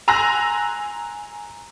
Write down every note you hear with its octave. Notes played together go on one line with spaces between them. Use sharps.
G#5 A#5 C6 E6 F#6 A#6